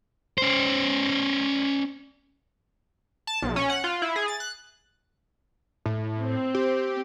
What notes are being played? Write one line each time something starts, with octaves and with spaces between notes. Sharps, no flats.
C#4 C5
A5
B1
C#4
F#5
F4
E4
G#4
A6
F#6
A2
C4
G4